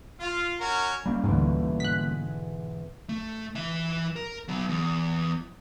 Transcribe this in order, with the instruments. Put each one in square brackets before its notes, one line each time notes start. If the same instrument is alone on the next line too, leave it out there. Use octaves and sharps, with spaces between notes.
[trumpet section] F4
C#4 F#4 A#4
[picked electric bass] G3 A#3 C#4
[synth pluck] D2 G#2 [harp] B2 D3 E3
[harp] G#2 G#3 [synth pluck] F#6 B6
[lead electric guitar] A3
E3 E5
A#4
F#3 B3
E2